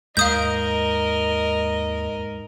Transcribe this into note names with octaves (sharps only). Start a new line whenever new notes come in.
D#2 G#2 A#4 D#5 F5 D#6 G6